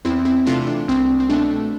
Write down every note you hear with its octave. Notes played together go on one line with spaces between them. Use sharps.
E2 C4 E4
C4 E4
C3 E3 A3 D4 F4
D4
C2 C4
C4
B2 A3 D4